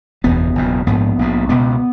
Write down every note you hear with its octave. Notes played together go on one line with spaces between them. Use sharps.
F#1 E2 B2 B3
F#1 E2 B2
A#1 G#2 B3
A#1 G#2
C#2 B2 B3